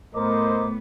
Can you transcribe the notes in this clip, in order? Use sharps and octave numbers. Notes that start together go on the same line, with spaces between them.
A2 B3 A#4 C5 D#5 D6